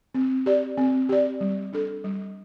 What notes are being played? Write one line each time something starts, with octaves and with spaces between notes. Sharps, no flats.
C4
G4 D5
C4
G4 D5
G3
D4 A4
G3